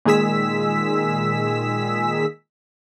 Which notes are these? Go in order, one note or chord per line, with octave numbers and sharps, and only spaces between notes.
A#2 D#3 G#3 G#4 E6 B6